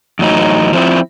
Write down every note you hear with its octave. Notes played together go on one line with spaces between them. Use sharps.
E2 A2 F#3 D#4
F3 C4 E4